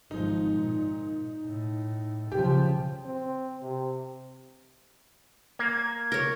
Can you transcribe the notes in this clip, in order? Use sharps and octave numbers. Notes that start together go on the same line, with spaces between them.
G#1 F3 D#4
A#2
A2
C#3 F3 G4
C4
C3
A#3 G#6
A#4 C#5